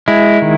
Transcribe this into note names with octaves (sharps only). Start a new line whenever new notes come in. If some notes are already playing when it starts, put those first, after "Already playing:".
G#3 E4
D#3